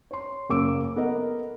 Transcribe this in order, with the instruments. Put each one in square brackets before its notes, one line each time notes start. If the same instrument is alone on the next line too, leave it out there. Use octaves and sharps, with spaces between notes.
[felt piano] C#5 C6
F#1 A#3 C#4 D6 E6 D7
B3 A4 A#4 D#5 F#5 A#5